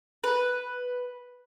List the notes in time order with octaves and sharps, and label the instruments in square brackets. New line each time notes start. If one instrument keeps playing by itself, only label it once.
[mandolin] B4